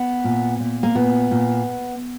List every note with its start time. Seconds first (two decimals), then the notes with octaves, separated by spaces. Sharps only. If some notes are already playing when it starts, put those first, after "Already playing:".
Already playing: B3
0.24 A#2
0.60 A#2
0.83 A#3
0.95 A#2 B3
1.31 A#2